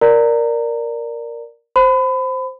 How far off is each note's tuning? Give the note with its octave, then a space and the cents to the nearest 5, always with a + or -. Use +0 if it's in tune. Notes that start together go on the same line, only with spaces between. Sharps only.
A#4 +0 D5 +0 A#5 -20
C5 +0 B5 +30